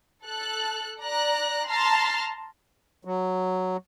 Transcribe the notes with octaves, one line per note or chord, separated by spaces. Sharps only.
A4 F#6
D5 A#5 F#6
A5 A#5 C6 F6
F#3